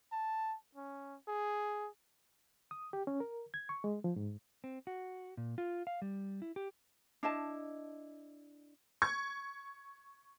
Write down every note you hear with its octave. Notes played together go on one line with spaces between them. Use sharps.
A5
C#4
G#4
D#6
G4
C#4
A#4
G#6
C#6
G#3
F3
G#2
C4
F#4
A#2
F4
F5
G3
E4
G4
D4 E4 D#5 A5
C#6 G#6